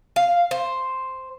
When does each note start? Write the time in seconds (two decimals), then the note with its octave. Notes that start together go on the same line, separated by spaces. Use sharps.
0.16 F5
0.51 C5